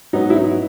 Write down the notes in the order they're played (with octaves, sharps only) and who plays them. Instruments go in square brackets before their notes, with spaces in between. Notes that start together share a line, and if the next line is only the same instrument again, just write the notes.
[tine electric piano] G#2 F#3 B3 [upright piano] D#4
[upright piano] E4
D#4